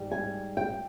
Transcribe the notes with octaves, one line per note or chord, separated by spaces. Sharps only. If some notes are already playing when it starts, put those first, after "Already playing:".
Already playing: G#2 G3
G#5
G5